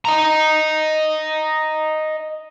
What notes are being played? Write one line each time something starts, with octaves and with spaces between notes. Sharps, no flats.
D#5 A#5